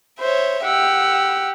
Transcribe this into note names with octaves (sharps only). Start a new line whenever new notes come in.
C5 C#5 E5
G4 F#5 E6